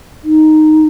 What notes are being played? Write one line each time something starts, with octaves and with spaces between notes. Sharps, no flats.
D#4